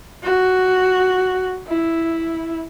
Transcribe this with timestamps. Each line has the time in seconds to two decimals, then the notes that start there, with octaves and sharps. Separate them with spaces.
0.23 F#4
1.68 E4